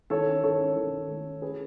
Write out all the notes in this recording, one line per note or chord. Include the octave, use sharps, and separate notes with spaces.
D#3 A4 C#5
C#4
D#3 A4 C#5
C#4
D#3
D#3
A3
C#4
C#4 G#4 B4